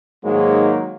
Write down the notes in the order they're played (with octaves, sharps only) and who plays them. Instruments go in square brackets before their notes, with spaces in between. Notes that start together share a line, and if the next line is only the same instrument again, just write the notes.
[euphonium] G#2 [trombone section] D#3 A#3 [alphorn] F#3 [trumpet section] G#3